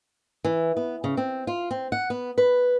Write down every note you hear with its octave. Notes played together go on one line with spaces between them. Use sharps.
E3
B3
C#3
C4
F4
C4
F#5
B3
B4